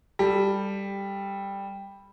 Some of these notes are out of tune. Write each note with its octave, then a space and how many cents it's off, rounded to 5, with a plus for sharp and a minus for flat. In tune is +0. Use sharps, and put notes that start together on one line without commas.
G3 +10 A4 +0